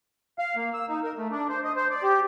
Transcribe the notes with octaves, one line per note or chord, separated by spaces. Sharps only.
F5
A#3
E6
D#4
A#4
A3
D4
C5
D#5
C5
D5
G4